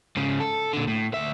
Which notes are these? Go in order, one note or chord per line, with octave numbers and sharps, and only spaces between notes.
G#2 C#3
A4
A#2 D3
A2
D2 E5